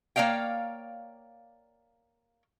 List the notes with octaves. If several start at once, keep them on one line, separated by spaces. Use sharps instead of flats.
A#3 C#5 D5 F5 G5